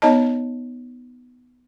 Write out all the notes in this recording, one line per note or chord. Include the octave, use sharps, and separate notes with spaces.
B3 D#4 C#5 D#5 A5